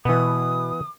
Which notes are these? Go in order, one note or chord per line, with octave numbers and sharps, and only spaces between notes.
B2 E3 B3 D#6